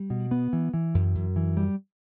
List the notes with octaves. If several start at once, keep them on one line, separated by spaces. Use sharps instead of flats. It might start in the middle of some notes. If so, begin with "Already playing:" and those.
Already playing: G3
B2
B3
E3
E3
F#2
F#2
E3
G3